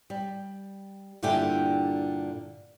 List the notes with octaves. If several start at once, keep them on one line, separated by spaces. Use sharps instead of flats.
G3
G2 A#2 D3 E4 G4 G#5